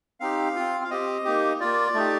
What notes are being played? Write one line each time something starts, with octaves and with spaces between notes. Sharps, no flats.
C4 D#4 G4 F5
C4 F4
F5
C4 G4 D#5
A#3 D#4 G4
A#3 F4 D5
A3 D#4 G4